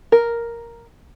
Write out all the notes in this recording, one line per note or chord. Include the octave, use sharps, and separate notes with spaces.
A#4